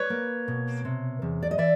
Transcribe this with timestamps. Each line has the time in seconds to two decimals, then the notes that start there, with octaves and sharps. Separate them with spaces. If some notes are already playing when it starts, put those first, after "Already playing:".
Already playing: B4 C#5
0.10 A#3
0.48 B2
0.85 C3
1.22 E2
1.43 D5
1.51 D#5
1.58 E3 D5 E5